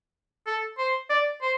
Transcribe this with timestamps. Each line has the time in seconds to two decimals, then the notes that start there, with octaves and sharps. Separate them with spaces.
0.47 A4
0.78 C5
1.10 D5
1.42 C5